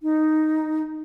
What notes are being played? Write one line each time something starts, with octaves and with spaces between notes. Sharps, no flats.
D#4